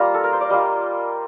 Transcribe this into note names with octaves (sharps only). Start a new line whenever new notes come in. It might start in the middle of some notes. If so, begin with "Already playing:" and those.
Already playing: G3 A#3 F4 A#5
A4
A#4
C5
D5
G3 A#3 F4 D#5